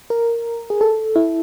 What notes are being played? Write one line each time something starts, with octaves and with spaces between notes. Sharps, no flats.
A#4
G#4
A4
E4